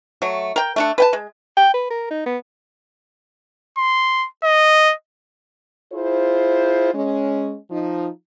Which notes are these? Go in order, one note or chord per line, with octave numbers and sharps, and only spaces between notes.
F#3 A3
A#4 G5
A3 D4 A4
B4 G5 A5
G#3
G5
B4
A#4
D#4
B3
C6
D#5
E4 F4 G#4 C5
G#3 C#4
F3 D#4